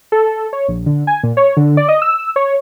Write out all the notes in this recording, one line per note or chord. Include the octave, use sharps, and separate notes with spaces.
A4
C#5
A#1
D3
G#5
A#2
C#5
D3
D5
D#5
E6
C#5